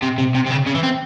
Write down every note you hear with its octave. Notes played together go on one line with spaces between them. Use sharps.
C3
C3
C3
C3
C#3
C#3
E3
C4